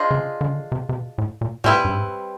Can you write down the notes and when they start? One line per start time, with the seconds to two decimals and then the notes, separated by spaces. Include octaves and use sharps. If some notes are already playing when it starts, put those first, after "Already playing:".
Already playing: D4 F4 G#4 C5 D#5
0.11 C#3
0.41 D3
0.48 C#3
0.55 D3
0.72 C3
0.89 C3
0.95 B2
1.18 A2
1.41 A#2
1.64 A2 G3 C4 E4 G#4 B4
1.85 G2
1.95 G#2